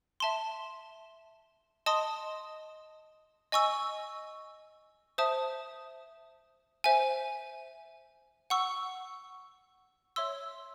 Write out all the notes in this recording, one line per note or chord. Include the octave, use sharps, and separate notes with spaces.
E5 A5 C6
D#5 A5 C6 D#6
D#5 G#5 C#6 E6
C5 E5 A5 D#6
C5 E5 G#5
F#5 C#6 E6
C#5 E5 C6 E6